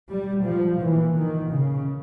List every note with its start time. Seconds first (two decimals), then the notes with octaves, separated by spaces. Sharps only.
0.09 G3
0.45 F3
0.80 A#2 E3
1.16 D#3
1.51 C#3